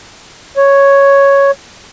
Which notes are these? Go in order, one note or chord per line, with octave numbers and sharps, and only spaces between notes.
C#5